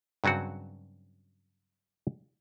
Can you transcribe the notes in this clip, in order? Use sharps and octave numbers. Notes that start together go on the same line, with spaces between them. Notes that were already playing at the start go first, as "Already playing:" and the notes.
G2 C#3 F#3 C4 F#4